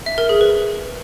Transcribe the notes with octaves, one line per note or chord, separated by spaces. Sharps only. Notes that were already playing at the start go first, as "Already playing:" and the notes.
E5
A#4
G#4
B4